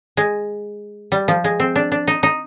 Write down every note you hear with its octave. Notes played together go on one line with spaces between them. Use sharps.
G#3
G3
F3
G#3
C4
D4
D4
D#4
D#4